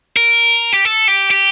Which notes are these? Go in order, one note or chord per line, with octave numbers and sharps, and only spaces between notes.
A#4
G4
A4
G4
G4